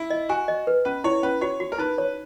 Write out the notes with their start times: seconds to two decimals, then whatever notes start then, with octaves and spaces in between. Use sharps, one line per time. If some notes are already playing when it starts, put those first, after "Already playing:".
Already playing: E4
0.10 D#5
0.29 F#4 G#5
0.48 D#5
0.67 B4
0.85 C#4 B4
1.04 E4 C#5
1.23 C#4 B4
1.41 F#4 C#5
1.60 F#4
1.72 A#4
1.78 D#4 B4
1.98 C#5